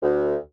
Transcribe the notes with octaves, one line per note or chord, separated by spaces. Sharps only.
D2